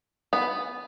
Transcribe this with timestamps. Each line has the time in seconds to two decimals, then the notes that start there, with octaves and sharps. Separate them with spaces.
0.33 B3